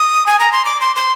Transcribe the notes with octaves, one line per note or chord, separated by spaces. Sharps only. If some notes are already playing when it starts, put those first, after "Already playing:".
Already playing: D#6
G#5
A#5
C6
D6
C6
C6